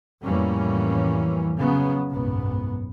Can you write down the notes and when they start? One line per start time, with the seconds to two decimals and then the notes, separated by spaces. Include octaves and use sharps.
0.21 F2 A2 E3 G3 A#3 C#4
1.57 C#3 F#3 B3
2.10 F#1 B1 G#2 B3